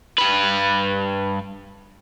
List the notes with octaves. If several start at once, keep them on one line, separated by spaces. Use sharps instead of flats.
G2 B4